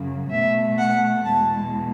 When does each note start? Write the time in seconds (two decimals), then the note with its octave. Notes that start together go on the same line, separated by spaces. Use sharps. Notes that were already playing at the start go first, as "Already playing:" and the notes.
Already playing: F#2 C#3 F#3
0.31 B2 A3 E5
0.78 F#5
1.24 E2 B2 G#3 A5